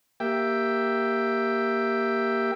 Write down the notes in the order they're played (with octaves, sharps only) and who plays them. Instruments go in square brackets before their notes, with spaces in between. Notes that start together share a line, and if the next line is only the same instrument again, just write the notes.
[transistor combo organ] A#3 G4 E5 G5